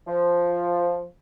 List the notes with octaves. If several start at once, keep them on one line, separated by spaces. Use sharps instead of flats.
F3